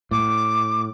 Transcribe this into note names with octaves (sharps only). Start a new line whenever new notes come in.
A2 D6